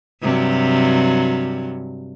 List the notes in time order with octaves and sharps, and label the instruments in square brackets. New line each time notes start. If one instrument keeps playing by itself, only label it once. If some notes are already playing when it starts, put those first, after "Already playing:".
[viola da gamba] G2 C3 F#3